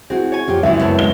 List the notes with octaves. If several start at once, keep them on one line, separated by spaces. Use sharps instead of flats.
C4 E4 F#4 G#4
C#5 G#5
F2 F4 G4
C#2 F#2 E4 E5
F#2 B3 C4 E4 A5
G#3 G7